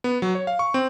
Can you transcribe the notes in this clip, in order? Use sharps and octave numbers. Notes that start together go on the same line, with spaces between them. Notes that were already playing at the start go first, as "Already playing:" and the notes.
B3
F#3
C#5
F5
C#6
C4